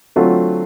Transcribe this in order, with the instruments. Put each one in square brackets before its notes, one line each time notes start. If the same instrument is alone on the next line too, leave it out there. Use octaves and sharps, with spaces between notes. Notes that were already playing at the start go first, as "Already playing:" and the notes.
[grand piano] D3 F#3 A3 C4 F4